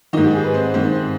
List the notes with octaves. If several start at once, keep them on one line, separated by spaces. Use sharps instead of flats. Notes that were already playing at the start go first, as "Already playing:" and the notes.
G#2 D#3 D#4 D#5
G4
G#4
B4
C4 C5
G#2 D#3 C4 C5